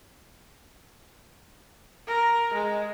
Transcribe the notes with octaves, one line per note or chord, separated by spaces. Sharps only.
A#4
G#3